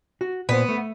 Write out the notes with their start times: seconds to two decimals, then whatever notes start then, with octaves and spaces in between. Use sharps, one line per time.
0.21 F#4
0.49 A#2 B3 C5
0.69 A3